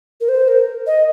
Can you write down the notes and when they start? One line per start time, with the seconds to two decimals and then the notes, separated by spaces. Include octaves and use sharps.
0.21 A#4
0.29 C5
0.48 A#4
0.87 D#5